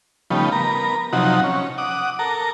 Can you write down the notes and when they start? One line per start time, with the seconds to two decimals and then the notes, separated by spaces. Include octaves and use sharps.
0.30 C#3 F3 G3 A3 B3 D#4
0.52 B3 A#4 A#5
1.13 C3 F3 F#3 D#4 F#4
1.44 C#4
1.78 F#5 D6 D#6
2.19 A4 A#4 A#5